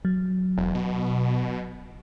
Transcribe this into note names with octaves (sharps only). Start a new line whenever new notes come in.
F#3
E1
B2